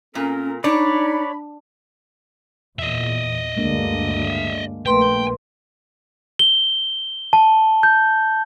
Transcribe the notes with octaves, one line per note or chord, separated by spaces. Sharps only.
A#2 C4 C#4 A4 A#4
D4 D#4 C#5 D5 B5
E2 A#2 D#5 E5
D2 G2 D3 G#3 A#3 D4
A#1 A3 A#3 B4 G5 C6
G7
A5
G6